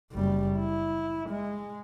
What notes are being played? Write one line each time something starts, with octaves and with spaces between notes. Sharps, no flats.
F#1 G3
E4
G#3